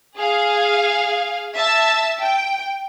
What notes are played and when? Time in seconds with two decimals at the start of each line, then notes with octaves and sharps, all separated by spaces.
0.18 G#4 F5
1.56 E5 A5 E6
2.18 G5